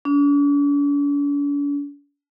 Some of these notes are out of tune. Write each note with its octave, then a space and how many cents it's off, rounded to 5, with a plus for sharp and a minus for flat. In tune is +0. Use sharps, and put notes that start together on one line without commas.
D4 -45